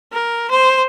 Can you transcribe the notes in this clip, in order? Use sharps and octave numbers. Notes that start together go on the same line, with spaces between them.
A#4
C5